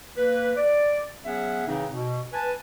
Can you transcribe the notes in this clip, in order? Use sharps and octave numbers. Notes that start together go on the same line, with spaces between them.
A#3 B4
D5
F#3 B3 C#4 G#4 E5 F#5
A2 C#3 E3 C4 D#4
B2
B4 G#5 A5